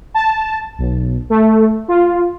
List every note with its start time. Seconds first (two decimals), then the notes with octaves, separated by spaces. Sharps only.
0.14 A5
0.78 B1
1.30 A3
1.88 F4